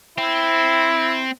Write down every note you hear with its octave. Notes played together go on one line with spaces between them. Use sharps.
C4 E4